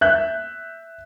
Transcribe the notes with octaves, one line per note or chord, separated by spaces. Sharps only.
E5 F#6 G6